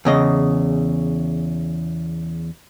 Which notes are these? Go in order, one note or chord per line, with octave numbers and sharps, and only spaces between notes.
E2 C#3 D#5